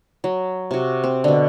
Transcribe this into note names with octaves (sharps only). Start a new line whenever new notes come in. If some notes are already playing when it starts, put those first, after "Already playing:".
F#3
C3 F#4
C4
B2 D3